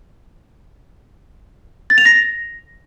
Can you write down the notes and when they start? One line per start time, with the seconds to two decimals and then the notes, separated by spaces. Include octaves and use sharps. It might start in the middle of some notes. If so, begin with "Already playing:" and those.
1.90 A6
1.98 F7
2.05 A#6